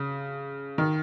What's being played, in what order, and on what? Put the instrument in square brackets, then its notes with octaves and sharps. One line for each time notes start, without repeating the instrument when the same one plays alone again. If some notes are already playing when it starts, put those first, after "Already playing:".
Already playing: [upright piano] C#3
D#3